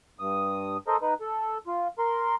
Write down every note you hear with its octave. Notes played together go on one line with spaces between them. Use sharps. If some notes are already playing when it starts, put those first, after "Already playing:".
G2 D#6
A4 A#4 C5 D#5
D#4 B4
A4
F4
A#4 C6